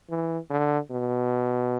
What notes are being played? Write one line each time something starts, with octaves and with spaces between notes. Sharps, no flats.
E3
D3
B2